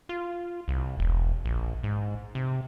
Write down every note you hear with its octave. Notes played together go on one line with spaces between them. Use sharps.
F4
C2
E1
A#1
G#2
C3